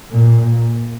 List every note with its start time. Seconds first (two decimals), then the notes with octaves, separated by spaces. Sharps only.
0.11 A#2